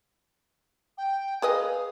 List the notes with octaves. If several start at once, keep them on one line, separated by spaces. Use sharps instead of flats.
G5
G#4 B4 D#5 F5